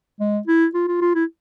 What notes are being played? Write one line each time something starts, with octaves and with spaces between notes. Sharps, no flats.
G#3
E4
F4
F4
F4
E4